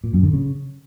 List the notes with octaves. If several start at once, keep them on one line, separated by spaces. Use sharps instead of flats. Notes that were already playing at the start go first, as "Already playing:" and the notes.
A#2
F#2
D3
C#3